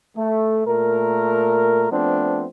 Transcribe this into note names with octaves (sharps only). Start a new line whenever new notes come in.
A3
A#2 A3 A#4
F3 A3 B3 C4 D4